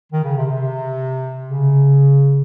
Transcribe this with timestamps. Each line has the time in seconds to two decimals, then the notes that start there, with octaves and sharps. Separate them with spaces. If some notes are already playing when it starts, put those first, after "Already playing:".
0.12 D#3
0.25 C#3
0.36 C3
0.49 C3
1.51 C#3